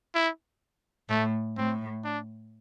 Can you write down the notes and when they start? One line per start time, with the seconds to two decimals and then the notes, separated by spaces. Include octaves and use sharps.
0.15 E4
1.09 A2 A3
1.57 A2 C4
2.04 D4